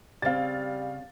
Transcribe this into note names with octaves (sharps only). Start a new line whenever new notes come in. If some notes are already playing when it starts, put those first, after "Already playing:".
C#3 G3 C4 F5 A6